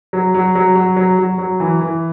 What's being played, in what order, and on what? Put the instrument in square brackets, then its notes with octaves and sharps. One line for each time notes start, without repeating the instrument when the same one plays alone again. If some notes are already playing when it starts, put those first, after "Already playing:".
[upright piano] F#3
F#3
F#3
F#3
F#3
F#3
F#3
E3
E3